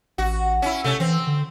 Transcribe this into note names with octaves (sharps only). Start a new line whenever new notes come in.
A1 F#4
C#4 E4
C3 A3 C#4
E3 C4
D3